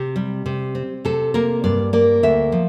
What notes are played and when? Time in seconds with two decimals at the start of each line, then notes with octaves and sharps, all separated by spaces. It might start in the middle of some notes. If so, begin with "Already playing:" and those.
Already playing: C3 G4
0.16 G3
0.46 C3
0.75 C4
1.05 C3 A4
1.34 A#3 A#4
1.64 G2 D5
1.93 A#3 D5
2.23 D2 E5
2.52 F3